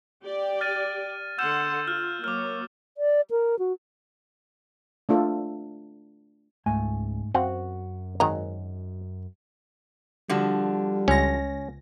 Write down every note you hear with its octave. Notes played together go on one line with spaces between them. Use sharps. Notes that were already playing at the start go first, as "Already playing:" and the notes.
G4 D5 G5
F6 A6 D#7
D3 F#5 C6 E6 G6 E7
F4 F6
F#3 A#3 C#5 D6 F6
D5
A#4
F#4
A3 D4 F4 A4
C#2 G#2 A3 G#5
F#2 C4 F#4 F5 F#5
G#1 D#3 F#3 G#3 A#5
D3 F3 G3 F#4
C#2 C#4 A#6